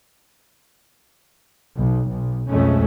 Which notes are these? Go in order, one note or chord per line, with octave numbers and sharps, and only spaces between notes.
B1
B1
B1 F2 G#3 A3 C#4